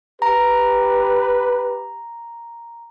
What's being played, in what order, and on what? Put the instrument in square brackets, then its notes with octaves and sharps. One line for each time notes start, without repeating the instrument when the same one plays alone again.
[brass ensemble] G4 [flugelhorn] B4 [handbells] A#5